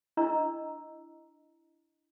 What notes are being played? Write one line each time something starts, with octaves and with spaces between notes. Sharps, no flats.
D4 E4 D#5 A#5 E6